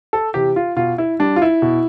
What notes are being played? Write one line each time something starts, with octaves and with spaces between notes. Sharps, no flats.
A4
C3 E3 G4
F4
B2 F4
E4
G3 D4
F4
E4
B2